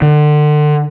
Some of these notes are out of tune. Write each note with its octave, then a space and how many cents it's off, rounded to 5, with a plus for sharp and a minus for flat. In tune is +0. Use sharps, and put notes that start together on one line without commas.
D3 +30